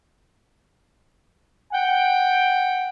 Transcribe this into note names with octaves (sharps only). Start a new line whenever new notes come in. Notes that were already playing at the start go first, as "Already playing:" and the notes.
F#5 G5